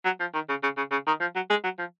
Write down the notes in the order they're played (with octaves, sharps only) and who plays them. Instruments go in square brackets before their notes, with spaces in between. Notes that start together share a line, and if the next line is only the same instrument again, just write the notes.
[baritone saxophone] F#3
F3
D#3
C#3
C#3
C#3
C#3
D#3
F3
F#3
G#3
F#3
F3